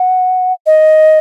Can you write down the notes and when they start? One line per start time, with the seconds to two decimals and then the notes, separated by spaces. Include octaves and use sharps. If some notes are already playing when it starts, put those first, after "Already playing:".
Already playing: F#5
0.66 D#5